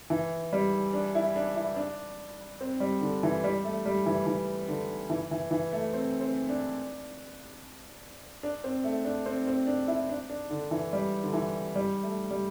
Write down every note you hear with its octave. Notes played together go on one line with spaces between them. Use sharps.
E3
G3
D4
E4
D4
E4
D4
C4
G3
D3
E3
G3
A3
G3
E3
E3
D3
E3
E3
E3
A3
C4
C4
D4
D4
C4
A3
D4
C4
C4
D4
E4
D4
D4
D3
E3
G3
D3
E3
G3
A3
G3